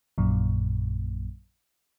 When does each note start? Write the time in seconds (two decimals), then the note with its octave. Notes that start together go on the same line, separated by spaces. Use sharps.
0.18 A#1 F#2 A#2